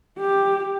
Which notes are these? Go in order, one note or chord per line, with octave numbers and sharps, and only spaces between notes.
G4